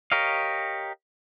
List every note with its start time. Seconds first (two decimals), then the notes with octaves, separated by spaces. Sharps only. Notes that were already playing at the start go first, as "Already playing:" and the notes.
0.12 G4 A#4 C#5 D#5 F5